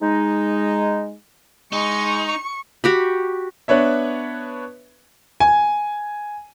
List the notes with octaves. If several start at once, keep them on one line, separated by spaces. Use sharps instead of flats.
G#3 D#4
G#3 D#4 C#6
F#4 G4 B5
B3 D4 B4 C#5 E5
G#5